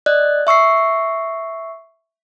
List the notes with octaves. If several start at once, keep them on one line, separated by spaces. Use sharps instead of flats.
D5 D#5 F#6
E5 C#6 E6 C7